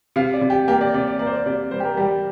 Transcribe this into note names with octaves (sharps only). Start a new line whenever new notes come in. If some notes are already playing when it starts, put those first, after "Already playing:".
C3 F5
D5
C3
G4
A#3 G4
D5
C3 D5
D5
A#3 D5
C5
D5
C3 D5
G3 C5
G4
A#4
G3 G4